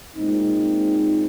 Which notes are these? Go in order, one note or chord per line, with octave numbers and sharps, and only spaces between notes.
A#2 G#3 C4 D#4